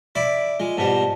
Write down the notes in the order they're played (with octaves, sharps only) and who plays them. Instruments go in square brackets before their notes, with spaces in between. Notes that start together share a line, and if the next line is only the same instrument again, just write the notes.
[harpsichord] E4 D5 B5
[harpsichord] G#3 [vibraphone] F4
[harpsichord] G#2 B2 G3 [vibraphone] F4 A5